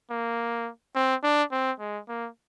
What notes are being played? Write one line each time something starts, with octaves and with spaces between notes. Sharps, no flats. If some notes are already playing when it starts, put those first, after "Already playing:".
A#3
C4
D4
C4
G#3
A#3